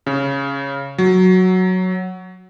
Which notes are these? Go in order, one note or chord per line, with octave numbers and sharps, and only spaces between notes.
C#3
F#3